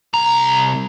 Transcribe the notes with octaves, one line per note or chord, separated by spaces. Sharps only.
C2 A#5